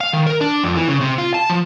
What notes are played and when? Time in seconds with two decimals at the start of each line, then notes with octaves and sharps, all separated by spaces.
0.01 F5
0.13 D#3
0.27 A#4
0.41 D4
0.64 F2
0.76 E3
0.88 C#3
1.01 C3
1.18 F4
1.34 A5
1.50 F3